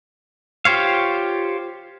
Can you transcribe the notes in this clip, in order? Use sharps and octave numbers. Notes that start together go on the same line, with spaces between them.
F4 G4 C5 C#5 F5